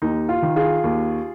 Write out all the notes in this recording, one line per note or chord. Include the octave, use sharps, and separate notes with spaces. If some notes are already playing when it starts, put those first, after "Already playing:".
D#2 D#4
F4
D#3
F4 G#4
D#2